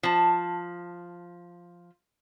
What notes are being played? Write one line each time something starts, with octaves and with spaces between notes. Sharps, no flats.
F3 A5